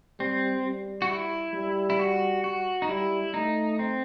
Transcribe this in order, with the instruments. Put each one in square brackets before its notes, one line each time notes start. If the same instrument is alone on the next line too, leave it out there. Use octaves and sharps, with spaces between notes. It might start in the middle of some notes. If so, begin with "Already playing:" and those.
[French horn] G3 [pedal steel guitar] C4
[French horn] G3
[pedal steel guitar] F#4
E4
[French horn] G3
[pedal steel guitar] E4
F#4
F#4
D#4
[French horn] G3 [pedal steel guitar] E4
[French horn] A3 [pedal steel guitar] D#4
[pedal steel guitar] C4